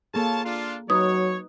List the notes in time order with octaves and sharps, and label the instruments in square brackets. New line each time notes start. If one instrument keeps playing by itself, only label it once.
[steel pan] A#3 G#4 A4 [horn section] F4 C#5 A5
[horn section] D4 F4
[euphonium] F#3 [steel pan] D#4 B4 [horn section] C#5 [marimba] D#6